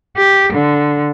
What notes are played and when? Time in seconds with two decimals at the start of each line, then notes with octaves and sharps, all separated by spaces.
0.17 G4
0.53 D3